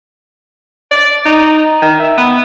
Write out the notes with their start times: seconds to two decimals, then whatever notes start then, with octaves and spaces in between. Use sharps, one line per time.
0.91 D5
1.25 D#4
1.81 D#3
1.99 E5
2.17 B3